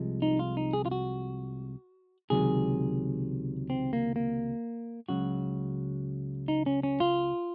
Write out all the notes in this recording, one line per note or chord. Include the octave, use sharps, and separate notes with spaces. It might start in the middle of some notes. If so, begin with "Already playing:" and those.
Already playing: C2 C3 F3 G#3
D#4
F4
D#4
G#4
F4
F#4
C#2 C3 D#3 F#3 G#4
C4
A#3
A#3
C#2 C#3 F#3 F#4
D#4
C#4
C#4
F4